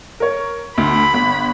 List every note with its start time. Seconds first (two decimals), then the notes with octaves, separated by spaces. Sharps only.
0.20 A#4 C#5
0.78 D2 B5
1.13 G1